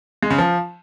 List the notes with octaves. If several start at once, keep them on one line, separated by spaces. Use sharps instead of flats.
G#3
C#3
F3